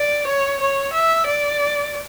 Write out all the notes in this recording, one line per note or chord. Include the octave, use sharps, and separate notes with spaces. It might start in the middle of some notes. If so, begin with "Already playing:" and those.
Already playing: D5
C#5
C#5
E5
D5